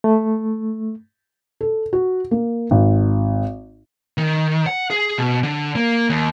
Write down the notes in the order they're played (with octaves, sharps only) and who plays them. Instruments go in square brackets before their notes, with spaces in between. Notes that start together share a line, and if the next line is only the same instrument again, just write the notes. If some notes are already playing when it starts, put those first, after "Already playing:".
[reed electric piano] A3
[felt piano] A4
F#4
A#3
G#1
[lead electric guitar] D#3
F#5
G#4
B2
D3
A#3
D#2